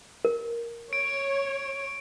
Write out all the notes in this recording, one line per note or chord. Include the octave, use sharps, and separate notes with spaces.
A#4
C#5 D7